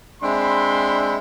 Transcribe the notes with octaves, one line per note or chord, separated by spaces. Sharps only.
G#3 C4 D4 E5 B5 C6